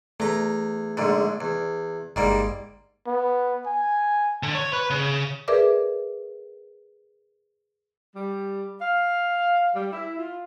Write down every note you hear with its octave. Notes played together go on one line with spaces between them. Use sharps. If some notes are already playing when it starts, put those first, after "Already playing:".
E2 A3 A#5
A#1 G#2 D3
E2
G1 G#2 G3 A#3
B3
G#5
D3
C#5
B4
C#3
G#4 A#4 B4 D5 E5 D6
G3
F5
G3
E4
F4